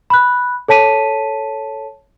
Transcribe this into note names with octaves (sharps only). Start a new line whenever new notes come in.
B5 F#6
A4 C#5 A5 B6 D#7